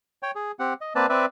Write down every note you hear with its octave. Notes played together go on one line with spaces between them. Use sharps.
C#5 G5
G#4
C4 G4 F#5
D#5
A#3 C4 B4 D5 A5
C4 B4 D5 E5